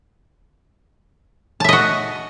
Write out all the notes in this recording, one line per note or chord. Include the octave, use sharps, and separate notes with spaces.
F#4 D#5 E5 A5